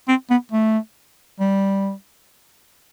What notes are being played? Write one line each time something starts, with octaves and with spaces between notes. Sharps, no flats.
C4
B3
A3
G3